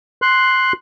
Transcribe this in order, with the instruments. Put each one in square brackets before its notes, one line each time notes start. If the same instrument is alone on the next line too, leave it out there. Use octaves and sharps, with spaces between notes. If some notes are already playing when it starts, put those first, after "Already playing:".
[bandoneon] C6 F#6